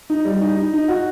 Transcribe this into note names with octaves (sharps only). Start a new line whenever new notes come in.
D#4
G3
D#4
D#4
D#4
F#4